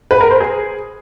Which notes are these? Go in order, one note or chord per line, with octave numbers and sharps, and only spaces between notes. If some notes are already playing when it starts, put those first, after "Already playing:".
B4
A#4
C5
G#4